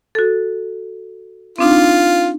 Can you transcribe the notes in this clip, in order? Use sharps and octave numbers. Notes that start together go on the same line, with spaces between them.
F#4 A4
C4 D4 D#4 F4